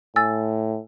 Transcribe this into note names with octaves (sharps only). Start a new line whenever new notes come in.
A2 G#5 E6 A6